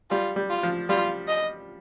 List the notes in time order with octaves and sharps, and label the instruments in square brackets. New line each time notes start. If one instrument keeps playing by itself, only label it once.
[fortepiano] G3 [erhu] F4
[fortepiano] G3
[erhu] F4
[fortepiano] F3
[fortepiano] G3 [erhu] F4
[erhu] D#5